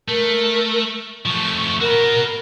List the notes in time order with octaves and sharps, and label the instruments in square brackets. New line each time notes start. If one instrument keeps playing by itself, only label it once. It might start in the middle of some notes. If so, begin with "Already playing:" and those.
[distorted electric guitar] A3 [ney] A#4
[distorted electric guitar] F3 A3 [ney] C#6
[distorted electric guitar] F#4 B5 [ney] A#4